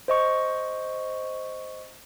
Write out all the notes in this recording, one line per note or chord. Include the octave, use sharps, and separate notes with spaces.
C5 D#5 C#6